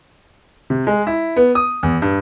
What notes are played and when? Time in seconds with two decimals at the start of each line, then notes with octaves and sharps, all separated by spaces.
0.70 C3
0.87 G#3
1.07 E4
1.36 B3
1.55 D#6
1.83 E2
2.02 G2